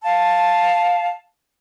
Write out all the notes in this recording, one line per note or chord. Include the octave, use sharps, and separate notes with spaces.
F5 A5